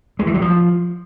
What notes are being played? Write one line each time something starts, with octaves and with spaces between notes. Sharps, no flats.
G#3
E3
F#3
F3